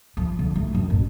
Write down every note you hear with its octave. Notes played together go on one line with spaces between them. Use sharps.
F3
D3
A3
F#2
A1